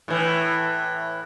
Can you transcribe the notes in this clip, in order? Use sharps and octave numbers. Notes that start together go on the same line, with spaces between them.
A2 E3